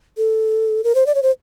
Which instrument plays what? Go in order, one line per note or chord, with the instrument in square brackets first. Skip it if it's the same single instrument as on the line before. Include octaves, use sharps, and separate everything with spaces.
[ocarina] A4
A#4
C5
D5
C#5
C5